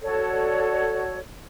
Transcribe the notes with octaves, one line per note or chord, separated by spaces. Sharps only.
F#4 A4 C#5 D5